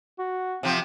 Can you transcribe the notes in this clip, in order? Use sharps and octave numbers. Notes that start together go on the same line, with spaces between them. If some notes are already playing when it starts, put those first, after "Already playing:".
F#4
C3 F3 C4